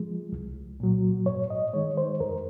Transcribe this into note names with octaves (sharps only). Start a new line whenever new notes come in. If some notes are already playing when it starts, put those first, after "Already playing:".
Already playing: F3 G#3
C2
A#2 F#3
G#2 C#5
D#5
D#3 G#3 C#5
C5
F2 A#4